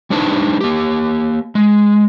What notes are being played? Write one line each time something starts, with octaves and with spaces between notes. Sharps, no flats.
G3 D4 D#4 B4 C5 A5
A#3 G4
G#3